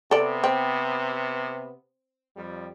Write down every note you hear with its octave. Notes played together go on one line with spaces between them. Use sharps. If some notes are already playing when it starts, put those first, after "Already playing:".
C3 B3 A4 D5
C4
F2 G3